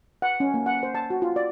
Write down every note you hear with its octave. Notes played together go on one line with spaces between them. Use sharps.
F#5
C#4
A#3
F#5
C5
A5
F#4
F4
D5